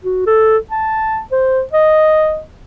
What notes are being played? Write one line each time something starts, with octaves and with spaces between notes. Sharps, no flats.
F#4
A4
A5
C5
D#5